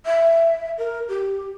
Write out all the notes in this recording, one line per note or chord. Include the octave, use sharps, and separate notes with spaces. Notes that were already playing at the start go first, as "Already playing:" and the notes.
E5
A#4
G4